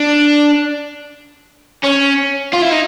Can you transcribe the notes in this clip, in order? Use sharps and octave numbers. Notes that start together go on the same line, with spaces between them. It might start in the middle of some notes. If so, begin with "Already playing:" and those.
Already playing: D4
C#4
F4
E4
D#4